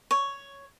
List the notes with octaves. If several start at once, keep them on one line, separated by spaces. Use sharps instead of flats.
C#5